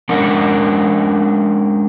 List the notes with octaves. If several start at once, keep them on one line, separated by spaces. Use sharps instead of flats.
G#3 C#4 D4 A#4 D5 F#5